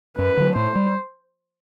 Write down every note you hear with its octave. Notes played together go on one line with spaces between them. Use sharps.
F#2 B4
D3 F#3
A2 C5
G3